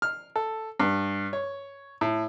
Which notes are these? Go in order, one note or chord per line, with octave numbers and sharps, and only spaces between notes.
F6
A4
G2
C#5
A2